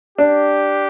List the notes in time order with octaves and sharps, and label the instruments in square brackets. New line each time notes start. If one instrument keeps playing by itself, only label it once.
[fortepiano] D4 [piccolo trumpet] G4